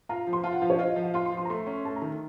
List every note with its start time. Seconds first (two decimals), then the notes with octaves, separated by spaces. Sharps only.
0.09 F4 A#5
0.27 F3
0.33 C6
0.44 F4 A5
0.52 F#5
0.62 F3 F5
0.70 C#5
0.79 F4 D#5
0.90 D#5
0.96 F3
1.03 F5
1.14 F4 C6
1.26 C6
1.32 F3
1.37 C6
1.45 A#5
1.50 A3 C6
1.67 C#4
1.85 A3 A5
1.96 A#5
2.02 D#3